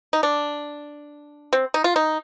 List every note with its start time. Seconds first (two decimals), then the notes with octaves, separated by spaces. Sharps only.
0.13 D#4
0.23 D4
1.53 C4
1.74 D#4
1.84 F4
1.96 D#4